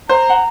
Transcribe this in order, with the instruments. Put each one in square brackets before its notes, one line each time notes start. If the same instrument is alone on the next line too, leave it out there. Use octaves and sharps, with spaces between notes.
[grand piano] C5 [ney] A#5
[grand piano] F#5